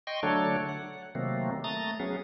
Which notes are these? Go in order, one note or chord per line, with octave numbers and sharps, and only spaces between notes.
D#5 G5 C6 C#6
D3 F#3 A3 D4 A4 C#5
F#5
C3 D#3 F#3 A3 A#3 C4
A3 A#5 D#6 A6
F#3 B3 C#4 G#4